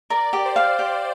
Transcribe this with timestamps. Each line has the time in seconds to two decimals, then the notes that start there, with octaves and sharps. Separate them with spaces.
0.10 A#4 D5
0.33 G4
0.45 C5
0.56 F5
0.79 G4